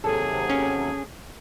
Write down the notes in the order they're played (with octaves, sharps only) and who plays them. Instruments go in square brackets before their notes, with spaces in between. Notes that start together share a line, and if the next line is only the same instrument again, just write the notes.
[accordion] D#2 C3 F#3 [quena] G#4 [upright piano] A4
[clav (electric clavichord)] C#4